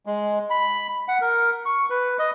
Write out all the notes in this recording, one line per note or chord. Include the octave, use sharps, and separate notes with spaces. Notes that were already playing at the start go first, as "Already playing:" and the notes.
G#3
B5
F#5
A#4
C#6
B4
D#5